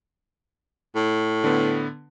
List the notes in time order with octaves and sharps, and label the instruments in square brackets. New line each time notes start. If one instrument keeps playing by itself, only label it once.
[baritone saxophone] A2
[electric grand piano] D3 B3